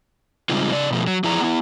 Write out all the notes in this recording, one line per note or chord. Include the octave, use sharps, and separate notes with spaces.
C#3 G3 G#3 C4 D#4 F4
C#3 D5
B2 F3 A3
F#3
F3 E4 G#4 D5 A#5
B3 E4